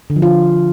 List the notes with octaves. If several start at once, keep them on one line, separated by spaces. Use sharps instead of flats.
D3
F3
F4